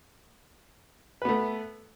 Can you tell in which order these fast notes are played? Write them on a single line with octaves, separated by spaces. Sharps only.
B4 B3 A3